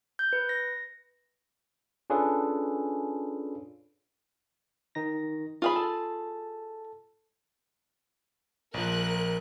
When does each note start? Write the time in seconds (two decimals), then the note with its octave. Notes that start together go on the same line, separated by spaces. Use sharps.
0.19 G6
0.33 B4
0.49 A#6
2.10 C#4 D4 F4 G#4 A4 B4
4.95 D#3 D#4 A#6
5.62 F4 G#4 B5
5.76 A4 A5
8.74 A#1 F3 A#4 F#6